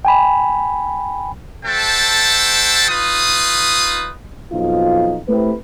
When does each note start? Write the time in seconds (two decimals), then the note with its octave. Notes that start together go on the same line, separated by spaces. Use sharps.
0.05 G5 G#5 B5
1.65 F#4 A4 C5 E5 G5 A5
2.89 D#4 F4 B4 D#6
4.52 B1 F2 D#4 F4
5.29 A3 C4 E4 G4 B4